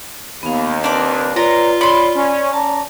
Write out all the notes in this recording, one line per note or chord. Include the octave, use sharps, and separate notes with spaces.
D#2 B3 F5
C4 D4 B4 D6
F4 B4 C#5 D5 A#5
C#5 D5 B5 C6
C#4 D5
C#4 D5 A5 A#5